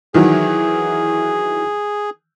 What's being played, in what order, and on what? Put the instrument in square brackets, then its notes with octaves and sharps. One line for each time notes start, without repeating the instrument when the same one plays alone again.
[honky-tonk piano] D#3 E3 F#3 [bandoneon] G#4